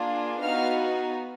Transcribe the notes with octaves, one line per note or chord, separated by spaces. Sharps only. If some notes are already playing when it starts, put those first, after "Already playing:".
Already playing: A#3 D4 F4 G#4
B3 D#4 F#4 F5 F6